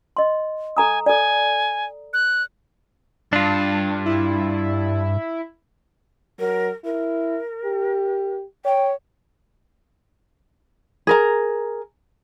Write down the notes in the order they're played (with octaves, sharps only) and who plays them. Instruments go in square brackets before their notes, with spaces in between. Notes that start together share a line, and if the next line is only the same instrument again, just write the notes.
[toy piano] D#5 C6
[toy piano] A4 A#5 D#6 [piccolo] G#5
[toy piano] A4 D5 [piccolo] G#5
[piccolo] F#6
[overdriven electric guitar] G2 [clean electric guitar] D4 F4
[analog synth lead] E4
[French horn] F#3 [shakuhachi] A#4
[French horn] E4 [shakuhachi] A#4
[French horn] G4
[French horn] C#5 [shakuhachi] G5
[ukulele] G#4 A#4 A#5